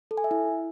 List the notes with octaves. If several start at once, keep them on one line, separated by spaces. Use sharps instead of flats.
A4
G#5
E5
E4